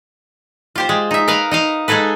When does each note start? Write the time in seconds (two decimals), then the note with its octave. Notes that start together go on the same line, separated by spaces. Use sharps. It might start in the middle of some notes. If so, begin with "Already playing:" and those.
0.76 F4 G4 C5
0.89 G#3
1.11 D#4 E5
1.28 A#4 B4 F5
1.51 D#4 D#5 F5
1.88 G#3 D#4 G#4 A4 B4